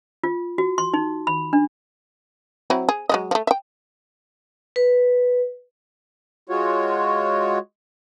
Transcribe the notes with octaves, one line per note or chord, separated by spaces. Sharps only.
F4
F#4
C6
D#4
B5
D4
F#3 C4 E4
G#4
F#3 G#3 D#5
F3 A3
E5 G5
B4
G#3 F4 F#4 C#5